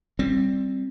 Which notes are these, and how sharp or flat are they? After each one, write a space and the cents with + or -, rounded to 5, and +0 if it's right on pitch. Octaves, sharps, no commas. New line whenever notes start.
G3 +0 C4 +10